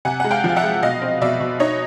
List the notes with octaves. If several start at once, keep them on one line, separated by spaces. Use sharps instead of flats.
C3 F#5 G#5
G#3 F#5
F5 G5
F3
F5
E5 F#5
G#3
B2 D#5 F5
C4
B2 D5 E5
B2
D#4 C#5 D#5